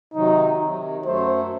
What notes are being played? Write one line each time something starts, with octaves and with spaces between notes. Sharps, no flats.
C3 D#3 F#3 D#4
C3 D#3 F#3
F#2 F#3 A3 C5